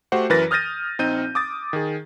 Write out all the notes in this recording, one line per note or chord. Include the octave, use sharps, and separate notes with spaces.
A3 F#4 G4 C5 F#5
F#2 E3 A#4 B4 A6 A#6
D#6 F6 G6 A6 A#6 D#7
A#1 C4 D#4 G6 D#7
D6 D#6 A6
D#3 G#4